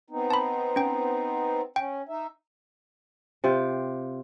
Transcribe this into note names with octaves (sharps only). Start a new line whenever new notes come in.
B3 C4 D#4
A5 B5
C#4 G5
C#4 G5
D#4 E5
C3 F4 G5